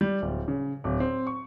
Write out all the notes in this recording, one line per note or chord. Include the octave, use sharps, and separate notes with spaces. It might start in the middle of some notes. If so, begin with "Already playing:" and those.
G3
D1
C#3
D1
C4
C#6